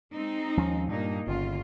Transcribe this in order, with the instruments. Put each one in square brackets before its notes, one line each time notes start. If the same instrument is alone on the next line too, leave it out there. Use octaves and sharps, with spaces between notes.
[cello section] G#3 C4 D#4
[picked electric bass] D#2 F3 C#4
[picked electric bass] G2 [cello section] A#2 A#3 D#4
[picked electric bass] G1 [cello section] C#3 A#3 F4